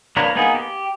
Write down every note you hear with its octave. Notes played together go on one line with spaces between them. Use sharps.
A#3 D4 A#4 B4 C#5
A#3 B3 D#4 G#4 B4
G4